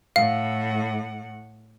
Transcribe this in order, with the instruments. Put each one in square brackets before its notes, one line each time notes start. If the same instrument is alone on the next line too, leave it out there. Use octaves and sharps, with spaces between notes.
[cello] A2 F#5 [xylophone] F5